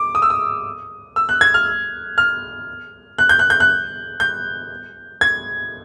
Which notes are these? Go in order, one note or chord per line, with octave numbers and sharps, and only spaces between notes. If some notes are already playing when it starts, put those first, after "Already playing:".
Already playing: D6
D#6
E6
D#6
E6
F#6
G#6
F6
F6
F#6
G6
F#6
G6
F#6
G6
G#6